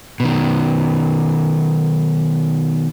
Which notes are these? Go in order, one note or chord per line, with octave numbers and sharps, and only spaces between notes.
B2 D#3